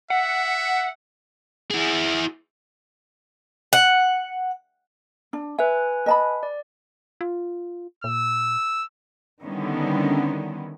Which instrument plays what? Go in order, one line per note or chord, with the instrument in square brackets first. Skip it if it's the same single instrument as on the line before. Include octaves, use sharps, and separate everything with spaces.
[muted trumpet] E5 [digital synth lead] F#5
[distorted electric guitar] E4 G#4
[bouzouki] F#5
[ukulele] D4
[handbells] B4 G#5 [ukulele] E5
[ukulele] D#5 A5 B5
[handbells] D5
[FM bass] F4
[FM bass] A#2 [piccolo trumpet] E6
[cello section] D3 D#3 G3 B3 C#4 E4